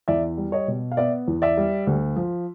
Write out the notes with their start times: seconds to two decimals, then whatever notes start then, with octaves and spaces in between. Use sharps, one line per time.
0.08 E2 D5 E5
0.37 G3
0.52 C#5 D#5
0.68 B2
0.92 F5
0.97 B3 D5 E5
1.28 E2
1.42 D5 E5
1.57 G3
1.87 D2
2.16 F3